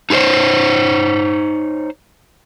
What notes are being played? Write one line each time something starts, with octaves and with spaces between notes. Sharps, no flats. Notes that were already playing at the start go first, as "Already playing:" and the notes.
D#4 F4 G#4 C5 C#5